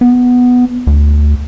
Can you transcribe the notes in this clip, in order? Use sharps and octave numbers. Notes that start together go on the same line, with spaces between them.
B3
D2